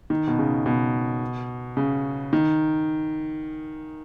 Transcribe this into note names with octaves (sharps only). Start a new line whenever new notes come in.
D#3
B2
C#3
B2
C#3
D#3